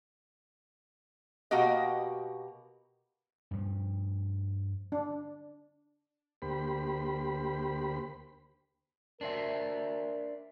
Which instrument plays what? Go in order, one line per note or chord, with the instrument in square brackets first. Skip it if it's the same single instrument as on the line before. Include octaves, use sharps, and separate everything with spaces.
[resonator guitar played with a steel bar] B2 A#3 F#4 G4 D#5
[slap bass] G2 F3
[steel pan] D4
[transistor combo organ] D2 A#3 G4 C5 B5
[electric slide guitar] D4 C5 E5 [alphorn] A#4